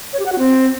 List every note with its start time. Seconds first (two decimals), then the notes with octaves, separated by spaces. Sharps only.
0.13 C#5
0.19 G4
0.26 F#5
0.32 F#4
0.39 C4